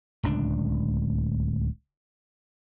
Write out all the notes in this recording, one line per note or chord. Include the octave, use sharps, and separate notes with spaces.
D1 C#2 D4